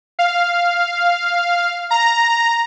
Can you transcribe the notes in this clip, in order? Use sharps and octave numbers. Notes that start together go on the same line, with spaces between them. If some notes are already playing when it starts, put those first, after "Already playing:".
F5
A#5